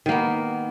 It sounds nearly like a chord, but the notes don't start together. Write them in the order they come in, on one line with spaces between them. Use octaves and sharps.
D#3 A#3 B3